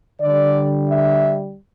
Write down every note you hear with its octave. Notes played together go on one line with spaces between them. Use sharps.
D3 G3 D5
E5